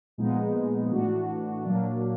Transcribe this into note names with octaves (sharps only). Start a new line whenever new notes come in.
A#2 F3 G#3 B3 D#4
A2 E3 A3 D4 F#4
A#2 F#3 A#3 D4